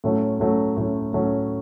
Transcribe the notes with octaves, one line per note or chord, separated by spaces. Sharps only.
A2 F#3 A3 C#4
A2 F#3 A3 C#4
A2 F#3 A3 C#4
A2 F#3 A3 C#4